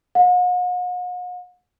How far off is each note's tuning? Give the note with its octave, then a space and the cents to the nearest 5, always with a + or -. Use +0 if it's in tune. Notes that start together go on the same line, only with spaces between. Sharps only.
F#5 -45